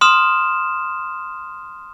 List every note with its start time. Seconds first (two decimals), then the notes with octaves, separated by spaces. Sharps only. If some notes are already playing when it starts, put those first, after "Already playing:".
0.01 C6 D#6 F6 E7